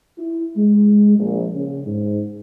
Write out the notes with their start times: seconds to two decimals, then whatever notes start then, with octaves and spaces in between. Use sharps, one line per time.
0.18 E4
0.56 G#3
1.19 A#1
1.53 C#3
1.85 G#2